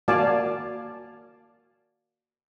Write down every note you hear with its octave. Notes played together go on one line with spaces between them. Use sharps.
A#3 F#4 D5 F5 G#5 A5